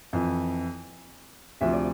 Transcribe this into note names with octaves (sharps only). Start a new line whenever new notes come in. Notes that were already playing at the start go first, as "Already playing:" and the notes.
F2 E3
D2 C3 F3 E5
D5